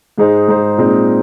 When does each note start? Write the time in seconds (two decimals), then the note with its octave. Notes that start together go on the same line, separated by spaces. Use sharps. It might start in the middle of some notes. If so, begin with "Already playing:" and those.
0.18 G#2 G#3 D#4 G#4 C5
0.48 G#2 G#3 D#4 G#4 C5
0.78 A#2 G#3 C4 D#4